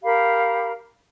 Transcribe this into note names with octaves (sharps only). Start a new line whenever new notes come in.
G4 A#4 F5 B5